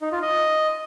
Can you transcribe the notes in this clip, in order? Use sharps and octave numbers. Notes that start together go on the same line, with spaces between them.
D#4
F4
D#5